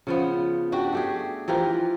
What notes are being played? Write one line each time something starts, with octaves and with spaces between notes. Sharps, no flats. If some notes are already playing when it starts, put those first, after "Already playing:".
C#3 F3 B3
D4 F#4 G4
A3 G4 G#4
E3 F3 G4 A#4